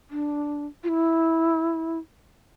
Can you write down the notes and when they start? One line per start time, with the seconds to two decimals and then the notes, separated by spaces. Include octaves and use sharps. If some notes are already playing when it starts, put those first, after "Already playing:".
0.11 D4
0.84 F4
0.89 E4